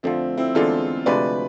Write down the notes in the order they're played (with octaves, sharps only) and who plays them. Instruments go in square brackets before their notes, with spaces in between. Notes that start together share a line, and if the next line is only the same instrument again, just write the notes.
[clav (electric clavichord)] F2 D3 F3 [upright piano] A3 C4
[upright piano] C4 E4
[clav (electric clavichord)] E2 D3 G#3 D4 [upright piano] F4 A4
[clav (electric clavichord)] D2 C3 F3 G#3 D4 [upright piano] B4 D5